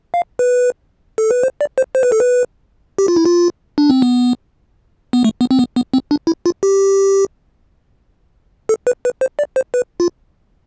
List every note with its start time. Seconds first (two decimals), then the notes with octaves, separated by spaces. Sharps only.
0.14 F5
0.39 B4
1.18 A4
1.31 B4
1.43 C5
1.61 D5
1.78 C5
1.95 C5
2.03 B4
2.12 A4
2.20 B4
2.98 G4
3.08 F4
3.16 E4
3.25 F4
3.78 D4
3.90 C4
4.02 B3
5.13 B3
5.24 A3
5.41 B3
5.51 C4
5.59 B3
5.76 B3
5.94 C4
6.11 D4
6.27 E4
6.46 F4
6.63 G4
8.69 A4
8.87 B4
9.05 B4
9.21 C5
9.39 D5
9.56 C5
9.74 B4
10.00 F4